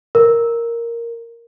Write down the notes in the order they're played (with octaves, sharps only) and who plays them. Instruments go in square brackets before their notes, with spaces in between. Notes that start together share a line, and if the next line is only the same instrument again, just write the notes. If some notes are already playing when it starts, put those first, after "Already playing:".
[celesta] A#4